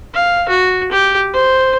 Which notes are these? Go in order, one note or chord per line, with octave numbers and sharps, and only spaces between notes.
F5
F#4
G4
C5